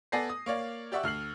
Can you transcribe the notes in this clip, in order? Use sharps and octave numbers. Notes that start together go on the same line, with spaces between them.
B3 A4 D5 G#5 A#6 C7
D#6
A#3 C#5 D5 F5
G4 D5 E5 F#5 C#6 E6
D2 F6 C7 F#7